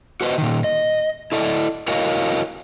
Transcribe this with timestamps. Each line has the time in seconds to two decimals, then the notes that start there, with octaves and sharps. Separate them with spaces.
0.21 F#4 B4 C5 D#5
0.38 A#2 D#3
0.64 D#5
1.32 E4 A4 D5 D#5
1.88 E4 F#4 A#4 C#5 D#5 F5